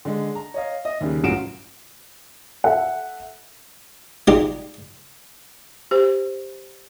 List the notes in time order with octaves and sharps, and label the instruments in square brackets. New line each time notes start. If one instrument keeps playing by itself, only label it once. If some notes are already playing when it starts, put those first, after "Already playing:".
[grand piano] D3 G#3
A#5
C#5 D#5 F5
D#5 E5
D#2 C#3 G3
A1 F#2 F4 F#4 D7 E7
A4 E5 F#5
[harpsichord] G3 G#3 D#4 F4 G4
[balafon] G4 C5